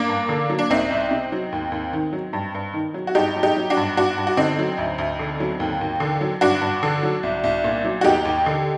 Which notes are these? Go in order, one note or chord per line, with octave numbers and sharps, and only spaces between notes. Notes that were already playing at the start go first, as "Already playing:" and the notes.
Already playing: A#3 D4
G2
D3
F#3
D4
C2 C4 D#4
C2
C3
F#3
D#2
D#2
D#3
F#3
G2
G2
D#3
F#3
F#4
G2 D#4 G4
F#3
D#4 G4
F#3
D4 F#4
G2
G2 D4 F#4
G2
F#4
D3 C4 D#4
F#3
D2
D2
D3
F#3
D#2
D#2
D3
F#3
G2 D4 F#4
G2
D3
F#3
C2
C2
A#2
F#3
F#4
D#2 D#4 G4
D#2
D3